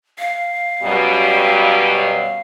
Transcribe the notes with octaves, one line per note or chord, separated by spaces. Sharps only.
F5
F#2 B2 G3